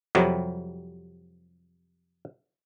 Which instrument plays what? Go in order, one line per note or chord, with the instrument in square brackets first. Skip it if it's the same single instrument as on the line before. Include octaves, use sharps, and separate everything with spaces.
[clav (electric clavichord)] F2 C3 F#3 G3